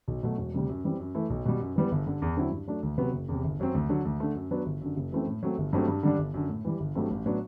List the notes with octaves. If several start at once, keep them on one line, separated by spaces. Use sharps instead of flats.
B1
B2 F#3 A3
E1
D2 C3 G3
F#2
E3 G3 C4
F#2
E3 A3 E4
B1
B2 G3
F#2
E3 G3 B3
G1
G2 D3
E2
D3 F#3 C4 E4
G2
F#3 A3 D4
D2
C3 F#3 B3
F#1
E2 C3
G1
F#2 F#3 C4
D2
D3 F#3
D2
D3 A3
F#2
F#3 B3 D4
G1
F#2 D3
F#1
F#2 E3 A3 C4
A2
F#3 A3 C4
G1
G2 F#3 A3 C4
G2
D3 G3 D4
G1
F#2 D3
A2
E3 G3
G1
G2 F#3 A3 C4
A1
A2 F#3 B3 D4